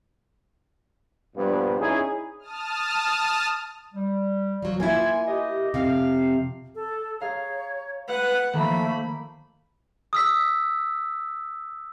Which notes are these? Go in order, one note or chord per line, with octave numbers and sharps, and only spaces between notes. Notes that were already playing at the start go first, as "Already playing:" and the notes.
G2 A#2 F3 B3 D4
C#4 D#4 E4 G#4
A5 D#6 F6
G3
F3 F#3
A#3 E4 F4 G#5
G4 D#5
F2 C3 F5
A4
G#4 C#5 F5 A#5
B4 F#5
D#3 F3 A3 A#3 B5
D#6 E6 B6